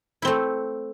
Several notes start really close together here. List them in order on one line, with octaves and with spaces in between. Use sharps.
E4 C4 A3